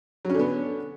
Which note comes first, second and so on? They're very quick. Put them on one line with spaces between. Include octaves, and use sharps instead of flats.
F#3 C#4 D3 B3